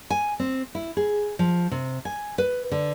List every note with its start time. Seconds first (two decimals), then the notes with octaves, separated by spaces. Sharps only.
0.10 G#5
0.40 C4
0.75 E4
0.97 G#4
1.39 F3
1.71 C3
2.05 G#5
2.38 B4
2.71 D3